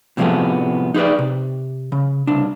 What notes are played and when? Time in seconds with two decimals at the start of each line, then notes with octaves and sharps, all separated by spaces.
0.17 A2 C3 F3 G#3 A3 B3
0.94 D#4 G#4 B4 D5
1.19 C3
1.92 C#3
2.27 C2 D4